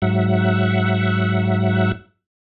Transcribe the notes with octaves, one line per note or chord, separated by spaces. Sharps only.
G#2 F#3 E5 F#5